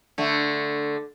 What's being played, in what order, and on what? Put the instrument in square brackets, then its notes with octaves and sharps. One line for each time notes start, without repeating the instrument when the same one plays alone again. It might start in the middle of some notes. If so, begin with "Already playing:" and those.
[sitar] D3 A3